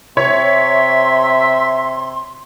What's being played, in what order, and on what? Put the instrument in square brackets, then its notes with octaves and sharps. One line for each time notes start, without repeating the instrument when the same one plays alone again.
[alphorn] C3 [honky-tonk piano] C#5 [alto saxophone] E5 [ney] C6